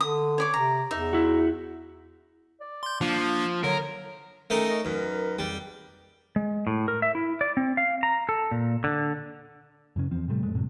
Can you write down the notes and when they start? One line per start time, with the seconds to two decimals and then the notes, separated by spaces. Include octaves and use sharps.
0.01 D3 D#6
0.38 C#5 D5 D6
0.54 C3 A#5
0.91 E2 D#4 E5
1.13 E4 F#4
2.61 D5
2.83 C6 G6
3.01 F3 A#3 D4
3.64 D3 F#3 A#4
4.50 D#3 A3 C#4 D#4 A#4
4.69 C#4 G#4 D#5
4.85 F#2 D#4 A#4 B4
5.39 F2 C#3 G3
6.36 G#3
6.67 A2
6.88 A#4
7.02 E5
7.15 E4
7.41 D5
7.57 C4
7.77 F5
8.03 A#5
8.29 A4
8.51 A#2
8.84 D3
9.96 F#2 C#3 C#4
10.11 E2 F3 C4
10.28 A2 C3 G3 A3
10.43 F2 G#3 A3
10.55 F#2 A2 C3